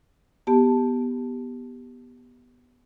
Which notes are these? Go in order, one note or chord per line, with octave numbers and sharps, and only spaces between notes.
B3 G4 A5